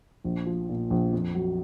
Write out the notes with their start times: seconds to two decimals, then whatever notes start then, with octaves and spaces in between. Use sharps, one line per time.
0.24 A#1
0.46 F3
0.69 A#2
0.90 A#1
1.13 F2
1.34 F#3